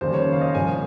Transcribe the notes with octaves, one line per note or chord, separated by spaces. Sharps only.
F1 D#2 C#3 G3 C5
C#5
F5
D#5
C2 A#2 F3 G#5